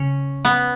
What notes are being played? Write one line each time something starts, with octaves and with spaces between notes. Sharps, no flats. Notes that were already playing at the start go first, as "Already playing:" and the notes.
Already playing: C#3 C#4
B3